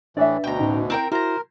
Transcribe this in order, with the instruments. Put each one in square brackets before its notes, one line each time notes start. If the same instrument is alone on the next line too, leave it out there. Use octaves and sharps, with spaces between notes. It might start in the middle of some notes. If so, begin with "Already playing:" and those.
[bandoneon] A2 E3 [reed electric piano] D4 B4 [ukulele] D5 E5
[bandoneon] D2 B2 [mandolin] G5 A#5
[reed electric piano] A2 C#4 D#4
[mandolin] C4 A#4 G5 [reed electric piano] E4
[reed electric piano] E4 F#4 [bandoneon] A#4 [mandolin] C5 A#5